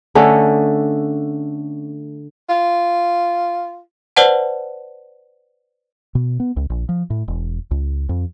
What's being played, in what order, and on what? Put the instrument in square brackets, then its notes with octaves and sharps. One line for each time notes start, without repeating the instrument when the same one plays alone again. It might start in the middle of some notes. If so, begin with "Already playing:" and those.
[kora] D3 A3 C#4 D#5
[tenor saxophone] F4
[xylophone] B4 C5 D5 F#5 A5
[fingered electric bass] B2
B3
C#2
A#1
F3
A2
E1
C#2
F2